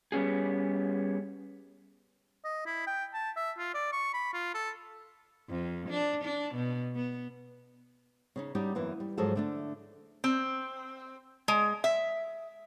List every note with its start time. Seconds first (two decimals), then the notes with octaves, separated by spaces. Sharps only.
0.12 G3 B3 C#4 G#4
2.45 D#5
2.66 E4
2.87 G5
3.14 A5
3.36 E5
3.58 F4
3.74 D5
3.93 C#6
4.13 B5
4.34 F4
4.54 A4
5.49 F2
5.90 D4
6.24 D4
6.54 B2
6.95 B3
8.36 C#3 C#4 D#4
8.55 G3 C#4 D#4 F#4 G4
8.75 F#2 E3 A#3 B3
9.00 G3
9.18 G#2 F3 F#3 G#4 A4
9.36 D3 A3 D4
10.24 C4
11.48 G#3
11.84 E5